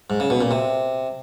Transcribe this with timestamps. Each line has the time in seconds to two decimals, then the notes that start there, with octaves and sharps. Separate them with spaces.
0.10 G#2
0.20 C#3
0.30 B2
0.41 A#2
0.51 C3